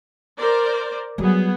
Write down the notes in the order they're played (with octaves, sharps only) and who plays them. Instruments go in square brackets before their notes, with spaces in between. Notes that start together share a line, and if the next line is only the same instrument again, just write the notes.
[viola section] A#4 C5 D5
[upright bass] F#3 G3 [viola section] B3 G#4